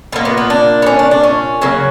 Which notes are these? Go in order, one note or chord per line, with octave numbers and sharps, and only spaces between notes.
A#2 A#3 B3
B3
B3
D4
B3
C#4
D4
D4
C#4
C#3 F#3 A#3